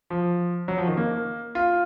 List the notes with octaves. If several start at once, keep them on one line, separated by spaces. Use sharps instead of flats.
F3
F#3
F3
D#3
A#3
F4